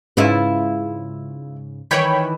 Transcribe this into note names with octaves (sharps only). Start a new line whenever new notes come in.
G#2 C#3 E4 F4 B4
D#3 E3 C#5 G5 B5